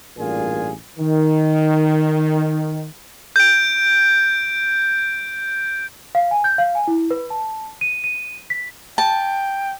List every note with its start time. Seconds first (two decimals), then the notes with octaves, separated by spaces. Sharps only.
0.18 A1 G2 A#2 F4 G#4 G#5
0.99 D#3
3.36 G6 D7
6.15 F5
6.31 G#5
6.44 G6
6.58 F5
6.75 G#5
6.88 E4
7.11 B4
7.30 A5
7.81 D#7
8.04 D#7
8.50 B6
8.98 G5 A5